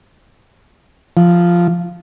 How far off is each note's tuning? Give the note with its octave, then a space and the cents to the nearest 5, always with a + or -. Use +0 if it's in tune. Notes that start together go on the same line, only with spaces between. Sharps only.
F3 -5